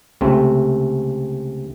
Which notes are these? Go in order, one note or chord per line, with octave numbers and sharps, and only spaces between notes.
C#2 C3 A3 C4